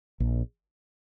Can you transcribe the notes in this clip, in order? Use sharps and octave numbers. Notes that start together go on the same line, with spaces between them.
A#1